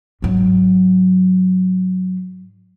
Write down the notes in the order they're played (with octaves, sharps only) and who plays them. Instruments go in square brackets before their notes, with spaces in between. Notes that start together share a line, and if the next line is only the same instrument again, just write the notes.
[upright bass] G#2 F#3